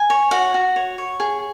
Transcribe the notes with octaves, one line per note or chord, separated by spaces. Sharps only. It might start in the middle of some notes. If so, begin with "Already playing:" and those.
Already playing: G#5
C#5
F#4 F#5
F#4
C#5
C#5
G#4